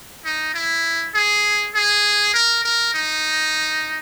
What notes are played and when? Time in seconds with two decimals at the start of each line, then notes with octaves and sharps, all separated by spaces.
0.25 D#4
0.54 E4
1.14 G#4
1.75 G#4
2.34 A#4
2.64 A#4
2.94 D#4